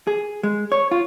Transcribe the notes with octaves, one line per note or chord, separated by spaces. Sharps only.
G#4
G#3
C#5
F4